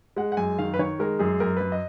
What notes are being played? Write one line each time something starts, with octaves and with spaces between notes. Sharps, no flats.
G#3 F#5
F#5
F#2 G#5
D#3 F5
B4
D#3 C#5
G#3 A#4
F#2 G#4
F#2 A#4
F#2 B4
D#5